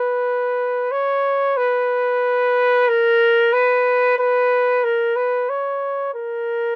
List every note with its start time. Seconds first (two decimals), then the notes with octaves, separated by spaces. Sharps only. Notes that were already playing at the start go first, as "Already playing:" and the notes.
Already playing: B4
0.91 C#5
1.57 B4
2.88 A#4
3.53 B4
4.18 B4
4.84 A#4
5.16 B4
5.49 C#5
6.14 A#4